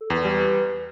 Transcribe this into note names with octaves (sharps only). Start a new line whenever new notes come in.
A4
E2 B4
G3